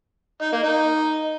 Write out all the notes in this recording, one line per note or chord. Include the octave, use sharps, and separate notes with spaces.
D#4
A#3
D#4